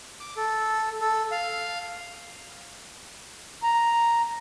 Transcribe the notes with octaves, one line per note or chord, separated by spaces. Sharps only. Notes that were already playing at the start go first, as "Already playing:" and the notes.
D6
A4
A4
F5
A#5